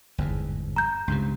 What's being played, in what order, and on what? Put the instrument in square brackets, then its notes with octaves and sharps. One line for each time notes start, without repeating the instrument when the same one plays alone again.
[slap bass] G1 E2 G#2
[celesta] A#5 G6
[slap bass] C#2 G2 C3